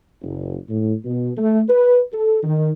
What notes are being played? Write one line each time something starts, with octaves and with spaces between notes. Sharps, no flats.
F#1
A2
B2
A3
B4
A4
D#3